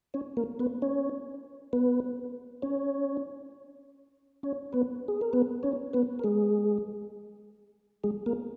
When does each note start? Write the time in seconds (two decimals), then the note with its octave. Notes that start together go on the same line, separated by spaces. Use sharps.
0.14 C#4 C#5
0.37 A#3 A#4
0.59 B3 B4
0.82 C#4 C#5
1.73 B3 B4
2.62 C#4 C#5
4.43 C#4 C#5
4.73 B3 B4
5.08 G#4
5.21 A#4
5.33 B3 B4
5.63 C#4 C#5
5.93 B3 B4
6.19 A#4
6.24 G#3 G#4
8.04 G#3 G#4
8.26 A#3 A#4